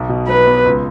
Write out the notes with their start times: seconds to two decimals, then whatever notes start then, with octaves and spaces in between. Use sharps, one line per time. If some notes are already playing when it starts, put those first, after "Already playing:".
Already playing: B1
0.09 B2
0.28 F#3 B4
0.47 B3
0.65 C#2